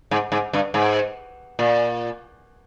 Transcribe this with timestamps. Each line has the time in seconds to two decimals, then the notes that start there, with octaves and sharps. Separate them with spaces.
0.11 G#2
0.32 G#2
0.53 G2
0.74 G#2
1.59 A#2